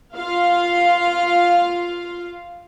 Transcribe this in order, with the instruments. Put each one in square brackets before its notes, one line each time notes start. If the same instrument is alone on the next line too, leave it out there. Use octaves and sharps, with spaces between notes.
[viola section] F4 F5